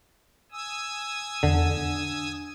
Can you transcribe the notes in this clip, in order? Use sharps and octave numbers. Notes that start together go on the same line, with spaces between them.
G#5 D#6 E6
E2 D3
D4